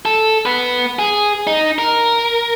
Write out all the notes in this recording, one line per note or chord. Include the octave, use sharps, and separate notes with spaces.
A4
B3 B4
G#4
D#4
A#4